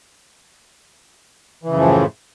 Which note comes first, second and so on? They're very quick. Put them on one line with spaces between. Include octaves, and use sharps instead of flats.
E3 C#3 F#2 F3 A2